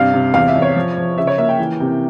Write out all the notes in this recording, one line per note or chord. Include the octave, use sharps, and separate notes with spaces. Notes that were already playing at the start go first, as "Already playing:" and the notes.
Already playing: G2 C3 F5
C3
E2 F5
E5
E2
C#5
F3
F3
C#3 E5
C#5
A#3 E5
G5
E3
C3